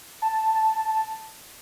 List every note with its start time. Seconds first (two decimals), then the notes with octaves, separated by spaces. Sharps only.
0.22 A5
0.85 A5